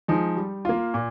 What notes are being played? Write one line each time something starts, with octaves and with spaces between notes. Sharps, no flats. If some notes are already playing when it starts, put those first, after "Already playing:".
F3 G#3 D#4
G3
A#3 F4
A#2